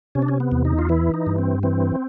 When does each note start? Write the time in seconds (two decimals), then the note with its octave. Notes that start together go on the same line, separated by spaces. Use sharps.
0.15 C3 C#4
0.22 D4
0.28 C#4
0.40 B3
0.52 E2
0.65 D#4
0.79 F4
0.89 E3 E4
1.14 D#4
1.27 G2
1.38 C4
1.63 E3 C4